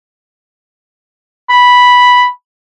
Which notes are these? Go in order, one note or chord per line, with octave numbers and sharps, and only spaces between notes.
B5